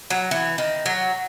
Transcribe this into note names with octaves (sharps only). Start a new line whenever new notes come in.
F#3
E3
D#3
F#3